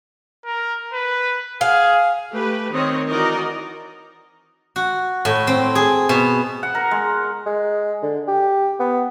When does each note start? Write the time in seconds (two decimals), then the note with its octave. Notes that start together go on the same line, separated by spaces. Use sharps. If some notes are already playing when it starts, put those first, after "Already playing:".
0.45 A#4
0.93 B4
1.61 G#4 F5
2.33 A3 G4 B4
2.72 D#3 C4 C#5 D#5
3.09 E3 D#4 F#4 A#4 D5 D#5
4.76 F#4
5.25 A2
5.47 C4
5.75 G#4
6.09 B2
6.63 F#5
6.75 A#4
6.91 G#3
7.46 G#3
8.03 D3
8.28 G4
8.80 B3